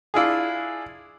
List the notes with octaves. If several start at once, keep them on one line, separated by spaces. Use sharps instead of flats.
D4 E4 F4 G#4